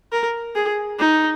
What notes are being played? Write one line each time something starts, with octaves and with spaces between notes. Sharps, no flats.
A#4
G#4
D#4